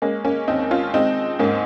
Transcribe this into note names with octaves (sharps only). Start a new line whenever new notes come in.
G#3 A#3 C#4
A#3 C#4
D#2 C4 D#4
C#4 F4
G#3 C4 D#4
G#2 A#3 C#4